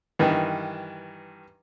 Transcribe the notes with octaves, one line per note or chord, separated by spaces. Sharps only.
G2 D#3 E3